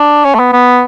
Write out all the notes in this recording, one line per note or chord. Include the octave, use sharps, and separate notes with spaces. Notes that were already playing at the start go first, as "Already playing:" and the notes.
Already playing: D4
C#4
A3
B3
B3